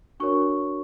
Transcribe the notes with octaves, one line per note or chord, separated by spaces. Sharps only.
D4 F#4 A#4 C#5 C#6